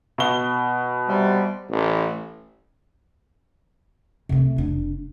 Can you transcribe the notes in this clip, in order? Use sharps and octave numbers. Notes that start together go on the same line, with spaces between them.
B2 G7
C3 G3
A1
C3 A3
F1 D4